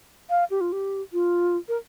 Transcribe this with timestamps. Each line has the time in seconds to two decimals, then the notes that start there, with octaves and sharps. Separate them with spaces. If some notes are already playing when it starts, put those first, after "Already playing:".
0.29 F5
0.50 G4
0.61 F4
0.72 G4
1.13 F4
1.68 A#4